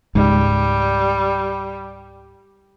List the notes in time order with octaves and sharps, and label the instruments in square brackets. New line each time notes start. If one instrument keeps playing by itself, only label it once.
[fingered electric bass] C#2 G#2 [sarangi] G3